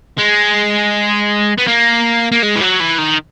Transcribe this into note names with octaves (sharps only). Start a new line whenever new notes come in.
G#3
B3
A#3
A#3
G#3
E3
F#3
E3
D#3